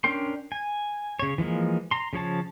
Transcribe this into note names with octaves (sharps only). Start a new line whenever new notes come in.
C#4 D4 A#4 G5 C6
G#5
C#3 C#5
E3 F3 G#3 A#3
A#5 C6
C#3 F3 C#5 A5